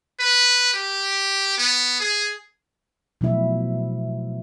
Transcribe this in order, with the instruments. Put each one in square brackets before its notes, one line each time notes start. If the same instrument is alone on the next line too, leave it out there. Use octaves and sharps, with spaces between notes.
[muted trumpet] B4
G4
B3
G#4
[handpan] B2 F3 F#3 A3 E4 E5